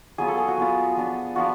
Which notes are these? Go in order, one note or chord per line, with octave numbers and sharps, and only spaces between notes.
F#3 B3 F4 G#4
A4
G#4
F#4
F#3 B3 F4
F3 B3 D4 F4
F3 B3 D4 F4 F#4